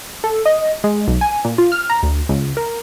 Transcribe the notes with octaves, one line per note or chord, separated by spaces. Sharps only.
A4
D#5
G#3
B1
G#5
A#2
F4
F6
A#5
D2
C#2
A#4